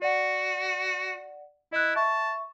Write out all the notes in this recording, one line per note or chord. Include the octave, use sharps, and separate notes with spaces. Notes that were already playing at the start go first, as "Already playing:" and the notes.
F#4 D5 F#5
E4 D#5 F#6
E5 A5 C#6